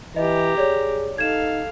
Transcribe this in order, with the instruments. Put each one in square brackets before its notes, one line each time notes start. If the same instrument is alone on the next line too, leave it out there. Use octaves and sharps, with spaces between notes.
[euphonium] E3 [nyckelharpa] G4 A#5 [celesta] D#5
[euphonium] G#4 [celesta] C#5 D5
[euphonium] D#4 [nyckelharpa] A4 F5 [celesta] G#6 E7